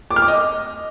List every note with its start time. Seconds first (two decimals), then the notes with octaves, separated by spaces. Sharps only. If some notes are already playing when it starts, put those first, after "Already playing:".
0.11 D6
0.16 F6
0.22 D6
0.28 D#5